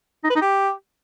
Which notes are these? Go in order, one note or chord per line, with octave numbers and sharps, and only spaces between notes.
D#4
B4
D#4
G4